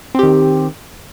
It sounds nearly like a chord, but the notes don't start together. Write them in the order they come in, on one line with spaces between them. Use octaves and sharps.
C4 G4 D#3